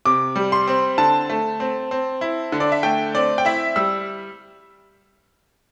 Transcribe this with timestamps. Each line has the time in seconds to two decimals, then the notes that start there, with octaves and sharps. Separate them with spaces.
0.05 C3 D6
0.36 G3
0.52 C6
0.67 C4
0.98 D3 A5
1.29 A3
1.60 C4
1.91 C4
2.21 E4
2.52 D3
2.60 D5
2.72 E5
2.83 A3 G5
3.15 C4 D5
3.38 G5
3.45 E4 E5
3.76 G3 E6